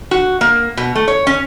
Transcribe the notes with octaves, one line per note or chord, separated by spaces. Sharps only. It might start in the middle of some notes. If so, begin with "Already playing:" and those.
F#4
A#3
B2
A3
C#5
C#4